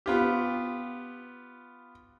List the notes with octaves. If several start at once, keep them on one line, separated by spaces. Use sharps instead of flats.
B3 F4 G4